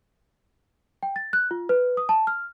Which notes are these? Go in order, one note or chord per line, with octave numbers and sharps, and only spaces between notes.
G5
A6
F#6
F4
B4
D#6
A5
F6